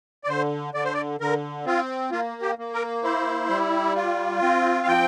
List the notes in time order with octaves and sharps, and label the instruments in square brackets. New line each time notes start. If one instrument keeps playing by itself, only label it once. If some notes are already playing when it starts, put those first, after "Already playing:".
[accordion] D5
D3 C5
D3 D5
C5
D5
D3 A#4
C4 F4
A#3 F4
G4
A#3
A#4
E4 C5
G3
F4
C4
F5
F3 G5